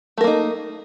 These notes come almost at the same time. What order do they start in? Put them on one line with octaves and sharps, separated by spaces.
A3 A#4 A#3 D#4